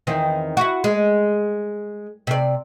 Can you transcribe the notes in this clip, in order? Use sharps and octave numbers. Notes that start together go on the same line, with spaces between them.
E2 D#3 C4
E4 F#4
G#3
C3 D5